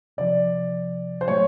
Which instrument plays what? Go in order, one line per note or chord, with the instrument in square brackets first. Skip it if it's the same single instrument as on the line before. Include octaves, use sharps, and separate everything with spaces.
[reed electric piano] C2 C3 F3 [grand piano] D5
[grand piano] C5
[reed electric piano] A2 F#3 A3 [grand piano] C#5